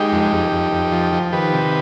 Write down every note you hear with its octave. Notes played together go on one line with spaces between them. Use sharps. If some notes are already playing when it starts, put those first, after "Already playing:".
Already playing: G#3 D#4 G4
F2
F2
F2
F2
F3
F3
D#3 G4 B4
C3